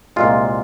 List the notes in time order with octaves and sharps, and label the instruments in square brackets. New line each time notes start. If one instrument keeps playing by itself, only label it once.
[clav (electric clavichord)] C2 A#2 G#3 F4